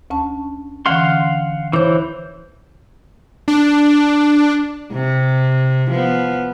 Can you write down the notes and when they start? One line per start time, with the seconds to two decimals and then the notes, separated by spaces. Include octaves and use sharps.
0.10 D2 C#4 A5
0.86 D3 E3 C#4 F5 F#5 C6
1.73 E3 C5 C#5 D6
3.48 D4
4.92 C3
5.91 F3 B3